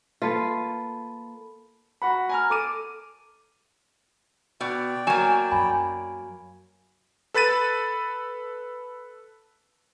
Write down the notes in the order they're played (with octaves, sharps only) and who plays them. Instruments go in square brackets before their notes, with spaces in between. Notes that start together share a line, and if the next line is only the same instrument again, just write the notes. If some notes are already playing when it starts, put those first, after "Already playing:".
[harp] A#3 A4 B4 [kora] F4
[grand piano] F#4 F#5 B5
G#5 A#5 F6
A4 D6 D#7
[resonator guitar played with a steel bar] B2 [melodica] D5 G5
[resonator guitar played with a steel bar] F#3 A#3 [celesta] G#5 E7
[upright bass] F#2 [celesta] G#5 B5
[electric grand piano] A4 B4 B5 A6 D#7